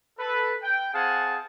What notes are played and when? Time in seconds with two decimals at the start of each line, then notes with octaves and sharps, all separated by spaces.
0.19 A4 B4
0.62 G5
0.93 C4 G#4 F5 F#5 G#5 A5